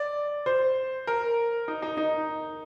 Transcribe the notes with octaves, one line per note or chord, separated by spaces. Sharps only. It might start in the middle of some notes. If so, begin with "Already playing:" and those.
Already playing: D5
C5
A#4
D#4
D#4
D#4